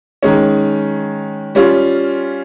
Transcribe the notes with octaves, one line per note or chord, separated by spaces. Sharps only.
D#3 G#3 C#4
G3 C#4 F4